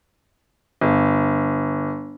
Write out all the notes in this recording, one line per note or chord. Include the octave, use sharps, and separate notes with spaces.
G1